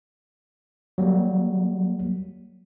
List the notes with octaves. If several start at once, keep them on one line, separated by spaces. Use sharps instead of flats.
F#3 G3 A#3